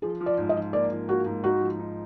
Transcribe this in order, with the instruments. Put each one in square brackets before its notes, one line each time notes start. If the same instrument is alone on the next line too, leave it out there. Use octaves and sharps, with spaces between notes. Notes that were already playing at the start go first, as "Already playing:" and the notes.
[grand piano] F3 [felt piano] G#4
[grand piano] F3
[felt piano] D5
[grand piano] G#2
[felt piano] D#5
[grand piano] F3
[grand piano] A#3 [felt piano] D5
[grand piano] F3
[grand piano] A#3 [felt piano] F#4
[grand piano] G#2
[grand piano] D#4 [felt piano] F#4
[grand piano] F3
D#4